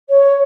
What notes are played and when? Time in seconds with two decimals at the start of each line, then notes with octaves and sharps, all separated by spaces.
0.09 C#5